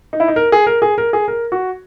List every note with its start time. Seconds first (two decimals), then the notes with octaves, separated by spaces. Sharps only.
0.13 D#4
0.20 E4
0.28 D#4
0.36 A#4
0.52 G#4
0.67 A#4
0.82 G#4
0.98 A#4
1.13 G#4
1.28 A#4
1.52 F#4